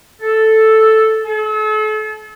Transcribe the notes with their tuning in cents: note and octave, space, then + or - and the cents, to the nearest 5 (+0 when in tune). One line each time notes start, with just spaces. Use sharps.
A4 +0
A4 -40